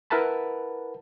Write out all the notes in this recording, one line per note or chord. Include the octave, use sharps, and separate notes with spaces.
E4 A#4 B4 F#5 A5 B5